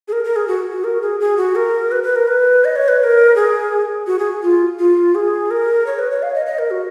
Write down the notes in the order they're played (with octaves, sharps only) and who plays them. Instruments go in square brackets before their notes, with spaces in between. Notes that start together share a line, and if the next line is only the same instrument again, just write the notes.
[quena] G#4
A#4
A#4
G#4
F#4
F#4
A#4
G#4
G#4
F#4
A#4
B4
B4
A#4
B4
D#5
C#5
B4
B4
A#4
G#4
F#4
G#4
F4
F4
G#4
A#4
C#5
B4
C#5
F5
D#5
D#5
A#4
F#4